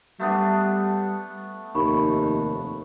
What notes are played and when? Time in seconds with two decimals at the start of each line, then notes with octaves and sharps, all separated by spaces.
0.20 G3 A3 B3 D4
1.75 F1 D#2 B5 C#6